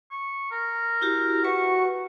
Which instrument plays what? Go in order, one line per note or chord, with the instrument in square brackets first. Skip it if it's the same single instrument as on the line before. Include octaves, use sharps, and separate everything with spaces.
[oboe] C#6
A#4
[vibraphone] E4 F#4 G4
[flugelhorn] F#4 [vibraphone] B4 E5 [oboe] C#6